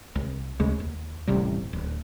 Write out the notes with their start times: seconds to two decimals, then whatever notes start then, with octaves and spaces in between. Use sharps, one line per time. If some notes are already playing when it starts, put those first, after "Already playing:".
0.15 C2
0.60 D2 C#3 G#3
0.80 D#2
1.27 D#1 A1 C3 G3
1.73 D1